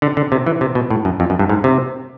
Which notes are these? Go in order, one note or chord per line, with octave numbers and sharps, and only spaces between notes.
D3
D3
C3
E3
C3
B2
A2
F#2
F2
F#2
G2
G#2
C3